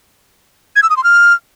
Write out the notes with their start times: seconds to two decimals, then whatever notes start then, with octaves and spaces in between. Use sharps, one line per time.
0.76 G#6
0.83 E6
0.90 D#6
0.97 C6
1.04 F6